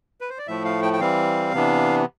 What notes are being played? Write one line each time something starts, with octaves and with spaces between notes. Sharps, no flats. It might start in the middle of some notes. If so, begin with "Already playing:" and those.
B4
C5
D5
A2 F3 A3 E5
F5
G5
G5
E3 G3 C4 F5
C3 E3 B3 D4